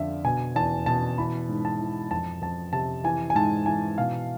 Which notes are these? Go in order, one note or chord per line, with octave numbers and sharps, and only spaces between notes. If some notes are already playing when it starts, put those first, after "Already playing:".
Already playing: F2 D3 D5 E5 F5
B2 G#5
E2 A5
B2 A5
E3 B5
G#2
A5
E3
F2 A5
F2 A5
C3 A5
E3 G#5
G#5
G#2 A5
E3 G#5
B2 F5